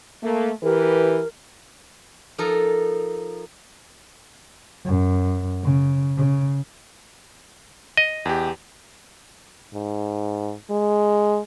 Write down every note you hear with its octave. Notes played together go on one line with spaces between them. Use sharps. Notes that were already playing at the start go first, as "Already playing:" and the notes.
A3 A#3
E3 G4 A#4 B4
F3 D#4 A4 A#4
F#2
C#3
C#3
D#5
E2 G4
G#2
G#3